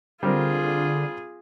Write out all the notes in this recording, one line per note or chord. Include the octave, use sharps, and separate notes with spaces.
D3 G3 C4 F4 G#4 A#4